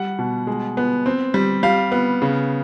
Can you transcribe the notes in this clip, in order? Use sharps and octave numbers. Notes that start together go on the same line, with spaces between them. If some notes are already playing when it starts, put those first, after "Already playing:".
Already playing: G3 F#5
B2
G#3
B3
C4
G3
G3 F5
B3
C#3